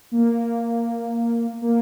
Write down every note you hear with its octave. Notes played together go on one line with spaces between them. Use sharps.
A#3
A#3